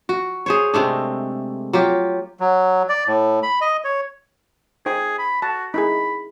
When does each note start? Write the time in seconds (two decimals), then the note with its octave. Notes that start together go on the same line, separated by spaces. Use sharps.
0.09 F#4
0.46 G#4 C5 C#5
0.74 C3 G#3 A3 D4
1.73 F#3 F4 G4
2.40 F#3
2.89 D5
3.07 A2
3.43 B5
3.61 D#5
3.84 C#5
4.86 D#4 G#4 C5 G5
5.19 B5
5.42 F#4 A5
5.74 D#4 E4 G#4 B5